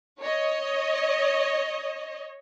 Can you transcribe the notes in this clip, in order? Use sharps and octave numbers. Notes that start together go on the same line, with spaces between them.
C#5 D#5